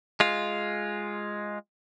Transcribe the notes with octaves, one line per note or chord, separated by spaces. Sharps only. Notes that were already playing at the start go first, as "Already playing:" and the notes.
G#3 F4